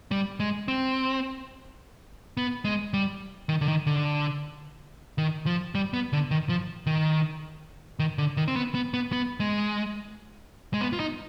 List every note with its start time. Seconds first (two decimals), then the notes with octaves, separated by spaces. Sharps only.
0.11 G3
0.40 G#3
0.68 C4
2.37 B3
2.65 G#3
2.93 G3
3.49 D#3
3.61 D3
3.68 D#3
3.87 D3
5.18 D#3
5.46 F3
5.75 G3
5.94 B3
6.13 D3
6.31 D#3
6.49 F3
6.87 D#3
7.99 D#3
8.18 D3
8.37 D#3
8.48 C4
8.56 B3
8.75 B3
8.94 B3
9.13 B3
9.40 G#3
10.74 G#3
10.81 B3
10.93 F4
11.00 D#4